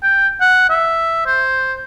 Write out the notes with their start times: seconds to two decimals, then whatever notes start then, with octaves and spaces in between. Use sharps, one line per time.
0.03 G5
0.40 F#5
0.69 E5
1.26 C5